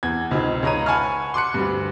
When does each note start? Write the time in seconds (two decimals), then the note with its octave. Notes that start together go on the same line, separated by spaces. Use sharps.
0.03 E2 G#6
0.31 C#2 C4 D#4 F4
0.63 C#2 C#5 D#5 A#5 D#7
0.86 F#5 G#5 A5 B5 C#6 F6
1.34 C6 D6 F#6 C#7
1.54 D2 G2